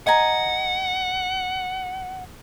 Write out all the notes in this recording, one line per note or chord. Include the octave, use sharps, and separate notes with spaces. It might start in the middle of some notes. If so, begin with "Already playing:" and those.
D#5 F#5 G#5 A#5